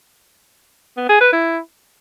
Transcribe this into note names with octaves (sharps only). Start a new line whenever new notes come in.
B3
G#4
B4
E4